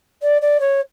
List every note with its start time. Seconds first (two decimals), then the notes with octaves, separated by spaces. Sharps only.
0.22 D5
0.41 D5
0.60 C#5